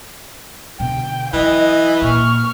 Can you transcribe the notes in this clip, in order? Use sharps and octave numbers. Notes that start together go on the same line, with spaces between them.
B2 D3 G5
E3 F#3 D#5
A#2 C#6 F6